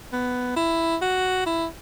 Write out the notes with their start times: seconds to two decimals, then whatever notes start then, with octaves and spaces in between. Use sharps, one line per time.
0.13 B3
0.57 E4
1.02 F#4
1.46 E4